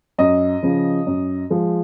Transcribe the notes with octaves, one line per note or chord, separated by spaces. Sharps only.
F#2 D#5
C#3 F3
F#2
F3 G#3